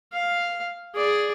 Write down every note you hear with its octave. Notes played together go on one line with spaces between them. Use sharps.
F5
G#4 D5